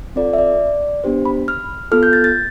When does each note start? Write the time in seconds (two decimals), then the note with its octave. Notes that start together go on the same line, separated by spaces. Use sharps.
0.16 C4 F4 A4 D5
0.33 E5
0.38 D5
1.04 B3 D4 G4 C5
1.25 B5
1.48 F6
1.92 B3 F4 A4 F6
2.03 G6
2.13 A6
2.24 A6